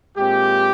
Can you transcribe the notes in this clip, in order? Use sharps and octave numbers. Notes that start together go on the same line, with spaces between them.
A#2 G#3 C4 G4